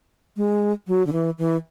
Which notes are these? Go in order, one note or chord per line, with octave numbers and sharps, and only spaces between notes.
G#3
F#3
D3
E3
E3